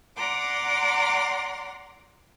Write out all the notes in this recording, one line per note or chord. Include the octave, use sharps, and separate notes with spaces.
D5 F#5 A#5 C6 D6